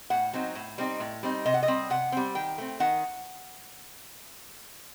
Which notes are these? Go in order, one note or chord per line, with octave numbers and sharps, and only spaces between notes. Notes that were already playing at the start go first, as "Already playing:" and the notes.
A2 F#5
F#3 C4 D#4
A2
G3 C4 D#4
A2
G3 C4 D#4
C3 D#5
F#5
D#5
G3 C4
C3 F#5
G3 C4
D#3 G5
A3 C4
D#3 F#5